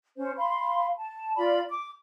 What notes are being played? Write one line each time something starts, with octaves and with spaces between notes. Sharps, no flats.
C#4 C5
F5 B5 C6
A5
F4 D5 B5
D6